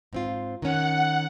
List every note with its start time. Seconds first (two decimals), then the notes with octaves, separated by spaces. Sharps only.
0.13 G#2 C4 F4
0.62 D#3 C#4 F#5